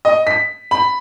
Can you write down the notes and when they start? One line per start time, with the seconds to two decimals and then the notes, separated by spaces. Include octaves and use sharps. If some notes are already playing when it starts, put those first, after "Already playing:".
0.05 D#5
0.27 B6
0.71 B5